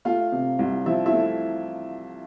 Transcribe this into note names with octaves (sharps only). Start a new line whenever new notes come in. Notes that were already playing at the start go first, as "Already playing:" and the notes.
A3 F4 F5
C3
C2
F3 E4 E5
E4 E5
A3